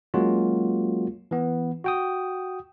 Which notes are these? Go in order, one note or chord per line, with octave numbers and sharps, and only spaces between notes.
F#3 G#3 A#3 C#4 F4 F#4
E3 B3
F#4 G5 D#6